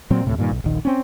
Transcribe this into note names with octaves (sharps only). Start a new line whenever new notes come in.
A#2 F#3 C4
D2 A2 C3
G2 A#2 D#3
B1
D#1 A#1 D#3
C4 C#4